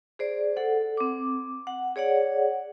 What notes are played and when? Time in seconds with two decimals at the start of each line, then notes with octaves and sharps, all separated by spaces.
0.19 G#4 C5 D5
0.57 A4 F#5
0.97 C4 D6
1.67 F#5
1.96 G#4 C#5 D5 F#5